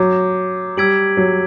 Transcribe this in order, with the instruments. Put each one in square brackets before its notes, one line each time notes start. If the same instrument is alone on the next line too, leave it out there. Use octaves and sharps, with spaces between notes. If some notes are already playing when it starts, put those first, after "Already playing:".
Already playing: [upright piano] F#3 [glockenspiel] D6 G6
[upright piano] G3 [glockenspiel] E6 G#6 B6 D7 F#7
[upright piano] F#3